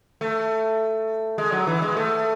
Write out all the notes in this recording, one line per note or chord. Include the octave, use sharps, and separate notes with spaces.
A3
G#3
F#3
E3
G#3
A3